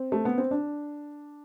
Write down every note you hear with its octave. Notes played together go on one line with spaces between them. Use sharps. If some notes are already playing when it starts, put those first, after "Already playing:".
Already playing: C4
A3
B3
C4
D4